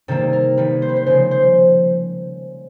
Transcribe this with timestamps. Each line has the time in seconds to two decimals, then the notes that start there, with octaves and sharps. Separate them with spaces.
0.08 C3 D#3 G3 A#3 A4
0.33 A#4
0.57 D#3 G3 A#3 B4
0.82 C5
0.89 B4
0.96 C5
1.06 C#3 F3 G#3 C5
1.31 C5